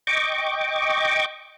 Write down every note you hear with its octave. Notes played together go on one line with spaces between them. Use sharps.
D#5 G5 C#6 D6